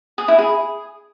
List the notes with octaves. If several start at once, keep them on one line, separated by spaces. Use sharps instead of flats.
G#4
E4
G#4